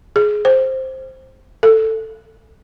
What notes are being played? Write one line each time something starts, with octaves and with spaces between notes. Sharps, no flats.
G#4
C5
A4